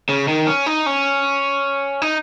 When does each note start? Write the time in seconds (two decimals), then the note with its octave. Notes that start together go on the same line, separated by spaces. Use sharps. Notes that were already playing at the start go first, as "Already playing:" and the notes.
0.09 C#3
0.28 D#3
0.47 C#4
0.66 D#4
0.86 C#4
2.02 D#4